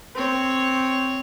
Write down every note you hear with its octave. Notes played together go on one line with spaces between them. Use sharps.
C4 C#5